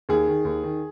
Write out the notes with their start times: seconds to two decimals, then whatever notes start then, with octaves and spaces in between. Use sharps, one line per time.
0.09 D#2 G#4
0.27 D#3
0.45 D#2
0.64 D#3